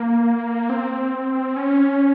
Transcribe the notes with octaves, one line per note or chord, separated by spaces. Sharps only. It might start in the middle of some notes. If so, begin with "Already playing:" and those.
Already playing: A#3
C4
C#4